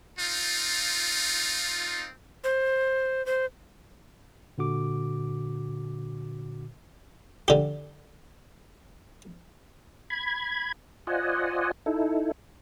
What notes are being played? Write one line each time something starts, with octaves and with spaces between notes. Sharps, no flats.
C4 D#4 F4
C5
C5
A#2 D3 F#4 D6
D3 G4
B5 G#6
F4 C5 D5 D#5 F#5 G#5
D#4 E4 A4